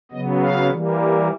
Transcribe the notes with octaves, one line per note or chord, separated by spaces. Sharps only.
C#3 F#3 B3 D#5
F5
E3 G3 A#3